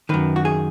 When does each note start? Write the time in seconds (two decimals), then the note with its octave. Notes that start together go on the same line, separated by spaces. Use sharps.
0.09 F#2 D#3 B4
0.36 F#4
0.45 G#4